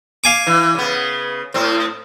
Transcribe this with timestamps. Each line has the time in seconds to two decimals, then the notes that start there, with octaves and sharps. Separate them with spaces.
0.24 F5 G#5 D6
0.47 E3
0.75 C#3 B3
1.54 A2 C4